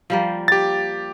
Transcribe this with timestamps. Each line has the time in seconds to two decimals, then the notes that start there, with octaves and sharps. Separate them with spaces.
0.10 F3 G3 A#3
0.48 G4 A6